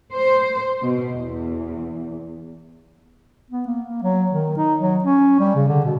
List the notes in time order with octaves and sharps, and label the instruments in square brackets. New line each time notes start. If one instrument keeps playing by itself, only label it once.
[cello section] C5
B2
E2
[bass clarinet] B3
A#3
A#3
F#3
D#3
D#4
F#3
C#4
G3
C#3
D3
B2